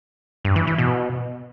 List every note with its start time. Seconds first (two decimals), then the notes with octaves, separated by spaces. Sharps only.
0.45 G2
0.56 E3
0.67 E3
0.78 B2